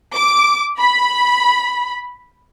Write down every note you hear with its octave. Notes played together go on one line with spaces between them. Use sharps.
D6
B5